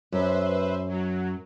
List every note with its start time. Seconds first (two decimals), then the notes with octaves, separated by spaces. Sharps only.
0.12 F#2 B4 C5 E5
0.88 F#3